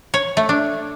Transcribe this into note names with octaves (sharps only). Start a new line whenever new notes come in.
C#5
A3
D4